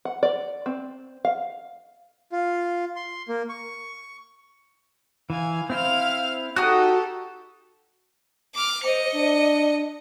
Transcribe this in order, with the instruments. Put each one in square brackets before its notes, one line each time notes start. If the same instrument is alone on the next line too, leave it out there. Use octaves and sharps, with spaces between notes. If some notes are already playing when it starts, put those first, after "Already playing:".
[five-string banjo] F#5
D5
C4
F5
[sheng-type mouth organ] F4
C6
A#3
C#6
[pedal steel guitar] E3 [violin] F5 G#5
[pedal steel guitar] C4 E4 C5 [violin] F5 F6
[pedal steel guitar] D#4 A5 F#6 [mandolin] F#4 D#6 [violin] G4 A4
[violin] D6 F6
[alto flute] C5 [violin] D#5 C#7
[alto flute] D4